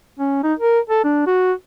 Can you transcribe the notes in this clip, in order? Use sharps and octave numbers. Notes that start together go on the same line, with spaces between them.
C#4
D#4
A#4
A4
D4
F#4